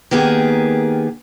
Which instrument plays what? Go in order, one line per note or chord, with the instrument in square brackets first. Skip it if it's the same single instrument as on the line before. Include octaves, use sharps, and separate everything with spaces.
[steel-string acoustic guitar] D#3 A#3 B3 G4 G#4